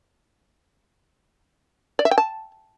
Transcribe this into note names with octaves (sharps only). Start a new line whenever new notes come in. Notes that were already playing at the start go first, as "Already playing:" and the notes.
D5
E5
G5
A5